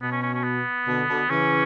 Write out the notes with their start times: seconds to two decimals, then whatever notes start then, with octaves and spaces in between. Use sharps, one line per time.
0.02 B2 B3
0.12 C#4
0.23 C#4
0.34 C#4
0.44 B3
0.86 B2 D3
1.08 B2 D3
1.29 C#3 E3 C#4